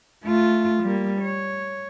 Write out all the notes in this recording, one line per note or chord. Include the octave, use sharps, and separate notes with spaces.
A3 F4
G3 A#3
C#5